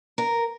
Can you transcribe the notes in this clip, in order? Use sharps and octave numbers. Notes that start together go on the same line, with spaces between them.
A#4